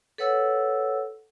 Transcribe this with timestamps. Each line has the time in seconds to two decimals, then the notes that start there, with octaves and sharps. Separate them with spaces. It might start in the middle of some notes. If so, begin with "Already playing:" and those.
0.18 A4 B4 C#5 F#5 E6